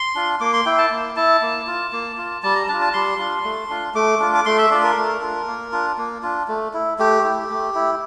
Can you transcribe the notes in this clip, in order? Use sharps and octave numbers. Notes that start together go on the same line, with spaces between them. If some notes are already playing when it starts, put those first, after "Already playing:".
Already playing: C6
D4 F4
A#3 D6
C6
E4 G5
A5
A#3
E4 A5
A#3
F4
A#3
F4
G3 A5
A#5
D4 F4 A5
A5
G3 C6
D4 F4
A3
D4 F4
A3 D6
D4 F4
D6
A3 C6
E5
D4 F4 D5
A#4
A3
D4 F4
A#3
D4 F4
A#3
D4 F4
A3
E4
A3 G4
E4
A3
E4